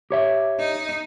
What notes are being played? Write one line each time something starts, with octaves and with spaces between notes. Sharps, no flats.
G4 C#5 E5
D#4